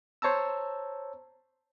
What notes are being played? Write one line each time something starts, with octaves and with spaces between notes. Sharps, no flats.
C5 C#5 A5 A#5 E6